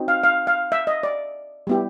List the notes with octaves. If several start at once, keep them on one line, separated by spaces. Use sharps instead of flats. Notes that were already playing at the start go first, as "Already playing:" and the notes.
Already playing: C4 D#4 F#4
F5
F5
F5
E5
D#5
D5
G3 B3 E4 G4